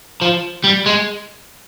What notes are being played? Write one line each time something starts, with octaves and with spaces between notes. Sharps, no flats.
F3
G3
G#3